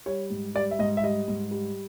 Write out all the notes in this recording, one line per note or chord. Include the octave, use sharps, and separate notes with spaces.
G3 C#5
G#2
G3 D5
E5
G#2 D#5
E5
G3 D#5
G#2
G3